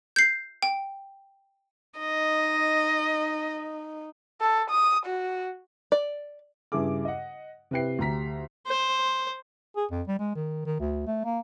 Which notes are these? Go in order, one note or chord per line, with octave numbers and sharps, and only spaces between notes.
G6 C7
G5
D#4 D#5
A4
D#6
F#4
D5
G2 C#3 E4 G#4 D6
D#5 F#5
C3 E4 B4 G5 C7
D2 G4 A#5 B6
C5
G#4
F2
G3
G#3
D#3
D#3
D2
A3
A#3